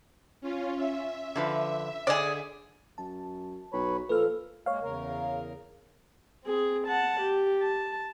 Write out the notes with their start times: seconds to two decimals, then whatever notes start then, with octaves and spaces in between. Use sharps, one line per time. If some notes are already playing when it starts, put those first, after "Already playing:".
0.41 C#4 F4
0.76 E5
1.36 D3 F3 B4
2.07 D3 G#4 D5
2.98 F#2 A5
3.73 B1 B4 C#5 B5
4.09 A#2 F3 A4 B4 F6
4.66 G#3 A#3 C#5 F5
4.82 E2 C#3 A#4
6.45 C4 G#4
6.87 F#5 A5
7.20 G4
7.62 A5